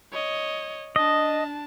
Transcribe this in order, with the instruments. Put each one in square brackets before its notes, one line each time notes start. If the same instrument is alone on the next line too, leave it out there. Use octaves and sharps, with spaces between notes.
[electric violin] C#5 D#5
[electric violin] D4 A5 [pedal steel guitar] D#5